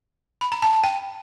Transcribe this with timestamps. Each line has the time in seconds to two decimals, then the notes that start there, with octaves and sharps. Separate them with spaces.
0.41 B5
0.52 A#5
0.62 A5
0.73 A5
0.84 G5